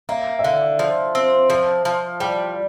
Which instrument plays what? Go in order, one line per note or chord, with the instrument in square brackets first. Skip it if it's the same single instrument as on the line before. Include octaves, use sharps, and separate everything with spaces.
[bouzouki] A#3 [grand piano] E5
[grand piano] E5
[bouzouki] D3 [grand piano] F5
[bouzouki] F3
C4
F3
F3
[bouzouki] G3 [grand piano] G5